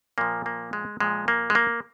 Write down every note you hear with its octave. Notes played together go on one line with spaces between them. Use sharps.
A#2 F3 A#3
A#3
G#3
A#2 F3 G#3
A#3
G#3
A#3